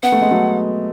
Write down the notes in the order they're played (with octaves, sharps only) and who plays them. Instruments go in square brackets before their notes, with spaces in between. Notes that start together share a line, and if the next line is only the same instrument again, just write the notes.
[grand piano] B3 [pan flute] F#5
[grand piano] A3
G#3
F#3 A3